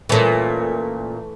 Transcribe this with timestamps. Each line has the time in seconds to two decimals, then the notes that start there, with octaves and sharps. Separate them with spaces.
0.09 A#2 E3 A3 C#4